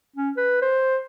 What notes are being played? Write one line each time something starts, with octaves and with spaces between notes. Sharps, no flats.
C#4
B4
C5